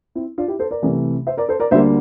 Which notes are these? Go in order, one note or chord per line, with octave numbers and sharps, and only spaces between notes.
C4 E4
D4 F4
E4 G4
A4 C5
A#4 D5
C2 C3 E3 A3
C5 E5
A#4 D5
A4 C5
A#4 D5
D2 D3 G3 A#3 C5 E5